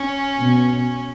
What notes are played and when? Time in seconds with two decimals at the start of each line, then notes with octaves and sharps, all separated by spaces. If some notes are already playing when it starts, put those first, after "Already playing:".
Already playing: C#4
0.37 B2